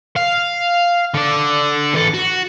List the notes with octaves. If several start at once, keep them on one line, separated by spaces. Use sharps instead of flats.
F5
D3 D5
E3 A4
F#4